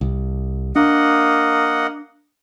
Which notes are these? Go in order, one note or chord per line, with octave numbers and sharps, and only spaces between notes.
C2
A#3 D4 D#5 F#5